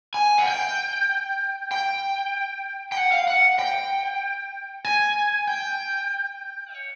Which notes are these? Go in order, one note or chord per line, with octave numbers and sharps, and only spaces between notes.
G#5
F#5
G5
G5
G5
F#5
F5
F#5
G5
G#5
G5
C#5